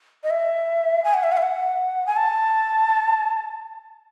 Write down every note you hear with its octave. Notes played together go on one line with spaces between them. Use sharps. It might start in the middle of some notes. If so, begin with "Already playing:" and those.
D#5
E5
G#5
F#5
E5
F#5
E5
F#5
G#5
A5